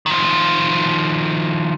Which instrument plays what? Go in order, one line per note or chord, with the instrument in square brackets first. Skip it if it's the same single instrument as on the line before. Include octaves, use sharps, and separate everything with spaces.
[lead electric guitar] D#3 F3